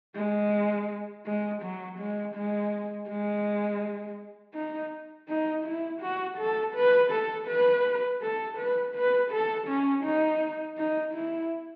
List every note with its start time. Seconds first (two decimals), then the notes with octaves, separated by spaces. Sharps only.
0.15 G#3
1.26 G#3
1.63 F#3
1.99 G#3
2.35 G#3
3.08 G#3
4.54 D#4
5.28 D#4
5.65 E4
6.01 F#4
6.38 A4
6.75 B4
7.11 A4
7.48 B4
8.22 A4
8.58 B4
8.95 B4
9.31 A4
9.67 C#4
10.04 D#4
10.78 D#4
11.14 E4